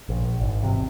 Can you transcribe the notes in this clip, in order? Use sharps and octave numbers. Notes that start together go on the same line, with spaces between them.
A#1
G#1
E2 C3